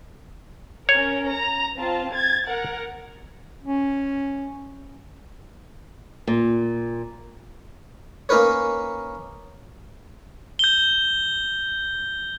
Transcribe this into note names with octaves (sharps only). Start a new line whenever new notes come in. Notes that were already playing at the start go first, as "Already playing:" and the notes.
C#4 A#4 C#5
A#5
C4 F4 A5
G#6 A6
A#4 F#5
C#4
A#2
A#3 C#4 D#4 A#4 B4 C#5
G6 G7